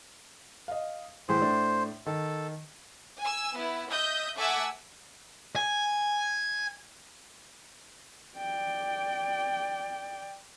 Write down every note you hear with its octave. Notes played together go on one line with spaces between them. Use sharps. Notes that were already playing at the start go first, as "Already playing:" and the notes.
D#5 F5
A2 E3 G#4 C5
A2 A3 D4
D#3 A4
G#5 E6
B3 E4
D#5 E5 D#6 G6
A3 E5 F#5 G#5 D6 E6
G#5
D5 G5